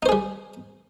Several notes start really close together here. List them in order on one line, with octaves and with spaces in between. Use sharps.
D#4 C5 G#4 G3